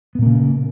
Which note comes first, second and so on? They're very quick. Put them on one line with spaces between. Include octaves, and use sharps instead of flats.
B3 A#2 A#3 C#3